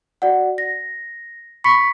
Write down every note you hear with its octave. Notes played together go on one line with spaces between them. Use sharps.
F#4 D5 F#5
A#6
B5 C#6 B6 C#7